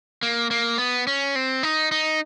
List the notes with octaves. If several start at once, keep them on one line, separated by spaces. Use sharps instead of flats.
A#3
A#3
B3
C#4
C4
D#4
D#4